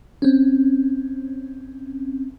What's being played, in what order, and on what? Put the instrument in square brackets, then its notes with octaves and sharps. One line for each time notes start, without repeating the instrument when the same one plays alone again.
[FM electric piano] C4 C#4